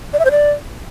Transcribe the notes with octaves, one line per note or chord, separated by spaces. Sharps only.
D5
E5
C5
D5